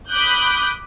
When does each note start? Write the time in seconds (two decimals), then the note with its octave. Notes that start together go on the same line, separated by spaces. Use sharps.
0.10 B5 D6 D#6 F#6 G6